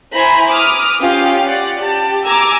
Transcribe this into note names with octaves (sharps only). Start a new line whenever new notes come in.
E4 C5 G#5 A#5 B5
D6 D#6 F6
C#4 F4 G4 F5
D5 F#5
G4 A5
G#5 A#5 D6 E6 G#6